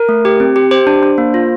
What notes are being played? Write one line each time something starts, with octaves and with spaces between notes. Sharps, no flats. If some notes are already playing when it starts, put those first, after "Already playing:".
Already playing: A#4
A3
G4
C4
G4
G4 C5
D4
D4
A#3
F4